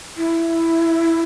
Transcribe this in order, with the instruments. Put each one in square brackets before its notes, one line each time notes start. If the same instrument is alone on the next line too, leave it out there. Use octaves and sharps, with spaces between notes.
[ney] E4